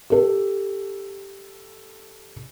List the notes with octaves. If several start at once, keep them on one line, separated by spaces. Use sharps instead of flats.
G4 A4